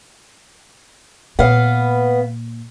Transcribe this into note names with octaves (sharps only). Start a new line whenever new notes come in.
A#2 B3 F5